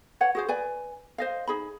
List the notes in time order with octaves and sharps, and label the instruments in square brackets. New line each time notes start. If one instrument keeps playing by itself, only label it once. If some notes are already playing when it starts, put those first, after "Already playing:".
[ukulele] B4 C#5 F#5
F#4 G#4 C5
B4 D5 G#5
C5 D#5 F5
D#4 G#4 B5